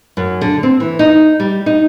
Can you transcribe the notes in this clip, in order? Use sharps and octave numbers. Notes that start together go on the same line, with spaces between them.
F#2
D3
C4
E3
D#4
G3
D#4